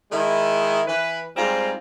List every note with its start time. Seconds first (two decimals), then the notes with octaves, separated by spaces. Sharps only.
0.11 D#3 G#3 D#4 E4
0.86 E3 B4
1.36 G#2 G3 C4 F4 G#5 A#5